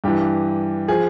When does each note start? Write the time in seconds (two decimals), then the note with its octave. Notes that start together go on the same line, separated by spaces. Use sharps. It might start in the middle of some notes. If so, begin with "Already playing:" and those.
0.04 G2 E3 G4
0.88 F3 G#4